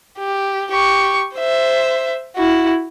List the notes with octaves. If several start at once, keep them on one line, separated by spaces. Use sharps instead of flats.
G4
G4 C#6
C5 E5
E4 F#4